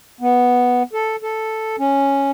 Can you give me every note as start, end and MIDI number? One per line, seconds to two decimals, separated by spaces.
0.21 0.83 59
0.93 1.16 69
1.22 1.76 69
1.79 2.31 61